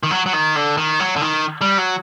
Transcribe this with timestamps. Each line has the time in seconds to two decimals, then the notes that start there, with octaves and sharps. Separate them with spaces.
0.03 D#3
0.11 F#3
0.26 F#3
0.33 D#3
0.55 D3
0.77 D#3
1.00 F#3
1.16 D3
1.22 D#3
1.61 G3
1.78 F#3